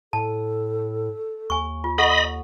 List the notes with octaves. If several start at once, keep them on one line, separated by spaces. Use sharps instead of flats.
A2 A4 A5
D#2 G#5 C#6
F4
A4 D#5 F#5 B5 C#6